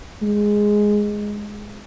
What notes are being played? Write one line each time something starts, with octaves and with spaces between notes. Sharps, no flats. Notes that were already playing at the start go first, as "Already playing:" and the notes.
G#3